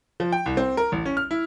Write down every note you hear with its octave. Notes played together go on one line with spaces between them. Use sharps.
F3
G5
C2
C4
A#4
A1
C#4
F6
E4